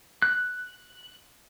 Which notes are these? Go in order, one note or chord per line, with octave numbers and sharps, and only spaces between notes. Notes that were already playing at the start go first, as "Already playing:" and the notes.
F#6